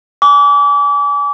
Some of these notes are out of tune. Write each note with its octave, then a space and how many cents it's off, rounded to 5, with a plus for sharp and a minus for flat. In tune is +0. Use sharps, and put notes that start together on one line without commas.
G#5 +0 D6 -35